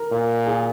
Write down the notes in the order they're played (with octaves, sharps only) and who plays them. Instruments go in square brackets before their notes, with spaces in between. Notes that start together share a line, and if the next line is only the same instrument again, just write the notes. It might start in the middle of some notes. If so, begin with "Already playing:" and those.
Already playing: [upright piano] A#4
[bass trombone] A#2
[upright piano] G#4